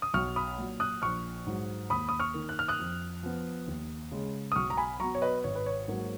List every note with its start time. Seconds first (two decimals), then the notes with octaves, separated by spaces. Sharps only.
0.02 D#6
0.14 B1 C#6 F6
0.36 B5 D#6
0.58 A#2 F#3
0.80 D#6 F#6
1.02 A#1 C#6 F6
1.47 G#2 F#3
1.90 D#2 B5 D#6
2.09 D#6
2.20 C#6 F6
2.34 D#3 A#3
2.49 F#6
2.59 F6
2.68 D#6 F#6
2.79 F2
3.23 F3 B3
3.67 D#2
4.12 C#3 G#3
4.52 D#6
4.56 B1 C#6 F6
4.70 A#5
4.77 G#5 B5
5.00 B2 F#3 A#5 C#6
5.15 C#5
5.22 B4 D#5
5.44 G#1 C#5
5.55 B4
5.66 C#5
5.88 G#2 F#3 A#3